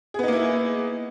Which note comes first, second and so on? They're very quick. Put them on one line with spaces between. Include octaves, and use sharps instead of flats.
G#4 B3 D#4 A#3 E4